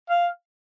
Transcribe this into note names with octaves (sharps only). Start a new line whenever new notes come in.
F5